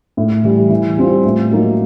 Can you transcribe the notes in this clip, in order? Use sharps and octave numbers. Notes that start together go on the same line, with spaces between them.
A2
E3 G3
E3
G3 C4 F4
A2
F#3 A#3 D#4